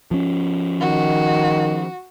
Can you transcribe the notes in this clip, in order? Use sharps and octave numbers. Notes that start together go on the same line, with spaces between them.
F3 C#4
D#3 F#4